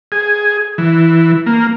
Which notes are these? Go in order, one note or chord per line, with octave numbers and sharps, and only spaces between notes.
G#4
E3
A#3